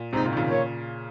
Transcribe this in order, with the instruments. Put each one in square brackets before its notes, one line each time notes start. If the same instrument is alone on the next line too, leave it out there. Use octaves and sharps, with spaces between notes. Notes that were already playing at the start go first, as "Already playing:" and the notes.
Already playing: [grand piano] A#2
[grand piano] G#2 C3 [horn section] G#3 C4 D#4
[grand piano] A#2
D#3
A#2 C#3
[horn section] A#3 F4 A#4 C#5